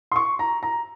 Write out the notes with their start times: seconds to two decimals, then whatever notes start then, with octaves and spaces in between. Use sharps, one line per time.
0.12 C6
0.16 C#6
0.39 A#5
0.63 A#5